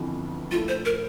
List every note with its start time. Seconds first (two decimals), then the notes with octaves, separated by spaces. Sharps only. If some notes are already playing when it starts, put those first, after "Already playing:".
Already playing: G1 F2 E3
0.51 A#1 A#2 A3 E4 F4
0.68 C5
0.85 A#4